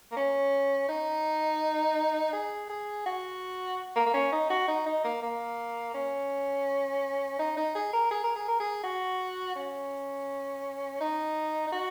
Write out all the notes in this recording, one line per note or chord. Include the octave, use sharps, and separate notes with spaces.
A#3
C#4
D#4
G#4
G#4
F#4
A#3
A#3
C#4
D#4
F#4
D#4
D#4
A#3
A#3
C#4
D#4
D#4
G#4
A#4
G#4
A#4
G#4
A#4
G#4
F#4
C#4
D#4
D#4
F#4